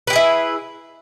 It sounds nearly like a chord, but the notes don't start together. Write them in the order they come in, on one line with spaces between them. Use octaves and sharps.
B4 G4 G#4 E4